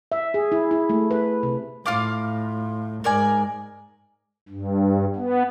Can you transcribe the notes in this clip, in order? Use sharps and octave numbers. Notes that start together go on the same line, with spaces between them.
E5
G#4
E4
E4
A3
B4
C3
A2 F4 F5 D6
G#2 A#4 D5 G#5
G2
B3